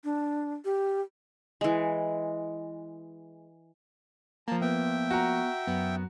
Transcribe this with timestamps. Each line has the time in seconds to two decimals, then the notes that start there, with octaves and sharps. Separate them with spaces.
0.04 D4
0.65 G4
1.61 E3 G#3
4.48 F3 A#3 A5 A#5
4.61 B3 B4 E5 G5
5.10 F#4 A#5
5.67 F#2 B3